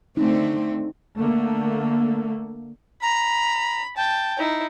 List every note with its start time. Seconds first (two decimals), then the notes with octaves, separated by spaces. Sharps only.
0.17 D3 A3 C4 D#4
1.17 D3 A3 A#3
3.02 A#5 B5
3.97 G5 A5
4.39 D#4 E4